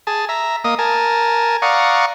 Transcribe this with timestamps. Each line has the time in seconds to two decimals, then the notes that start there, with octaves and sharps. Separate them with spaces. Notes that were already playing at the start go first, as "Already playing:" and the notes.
0.07 G#4 A5
0.29 E5 A#5
0.64 A#3 D#5 D#6
0.79 A#4 G#5 A5
1.62 D5 F5 F#5 A#5 C#6 D#6